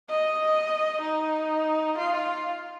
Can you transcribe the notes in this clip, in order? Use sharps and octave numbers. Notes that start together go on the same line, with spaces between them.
D#5
D#4
F4